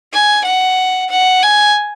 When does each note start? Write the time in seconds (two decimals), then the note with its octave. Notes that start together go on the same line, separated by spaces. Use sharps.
0.13 G#5
0.45 F#5
1.11 F#5
1.43 G#5